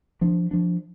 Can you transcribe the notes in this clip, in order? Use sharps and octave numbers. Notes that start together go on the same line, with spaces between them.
F3 D4
F3 D4